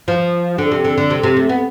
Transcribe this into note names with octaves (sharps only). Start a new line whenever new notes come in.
F3
D3
C3
D3
D3
C3
C3
A3
B3